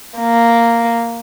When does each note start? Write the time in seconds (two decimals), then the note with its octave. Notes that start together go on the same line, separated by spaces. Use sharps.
0.19 A#3